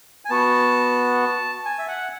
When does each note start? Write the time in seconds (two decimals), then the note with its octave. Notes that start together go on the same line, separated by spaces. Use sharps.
0.25 G#5
0.30 B3 F#4 A5
1.66 G#5
1.79 E5
1.88 F#5